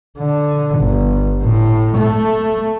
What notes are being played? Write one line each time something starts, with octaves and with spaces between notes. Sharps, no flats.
D3
G1
A2
A3